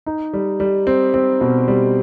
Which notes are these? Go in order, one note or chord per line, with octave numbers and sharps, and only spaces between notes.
D#4
G3
G3
C4
C4
B2
G3